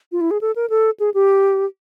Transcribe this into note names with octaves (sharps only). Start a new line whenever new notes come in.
F4
E4
G#4
A4
A#4
A4
G#4
G4